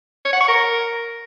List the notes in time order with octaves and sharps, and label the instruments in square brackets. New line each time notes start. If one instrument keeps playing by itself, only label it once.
[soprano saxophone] C#5
F#5
C#6
A#4